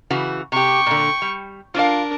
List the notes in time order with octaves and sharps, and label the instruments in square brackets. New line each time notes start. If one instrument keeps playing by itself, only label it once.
[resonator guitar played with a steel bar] C#3 E3 F#4
[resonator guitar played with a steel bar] C3 G4 [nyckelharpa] G5 C#6
[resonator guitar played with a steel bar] A#2 D3
G3
[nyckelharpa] D4 A#4 [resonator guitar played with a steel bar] F4 F5